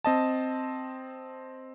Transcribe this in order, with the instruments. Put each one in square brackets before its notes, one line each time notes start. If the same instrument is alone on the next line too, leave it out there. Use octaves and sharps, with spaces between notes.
[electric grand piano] C4 D#5 A5